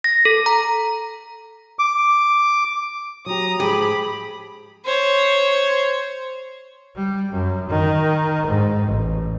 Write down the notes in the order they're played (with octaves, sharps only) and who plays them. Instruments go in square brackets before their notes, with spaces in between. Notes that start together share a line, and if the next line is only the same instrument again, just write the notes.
[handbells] A#6
A4
A#5
[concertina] D6
[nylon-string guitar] F#3 G4 [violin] A#5 D#6
[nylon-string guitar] G#2 F3 [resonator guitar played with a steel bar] G4 [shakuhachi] G#4 [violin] B5
[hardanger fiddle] C5 C#5
[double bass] G3
F#2
D#3
G#2
A1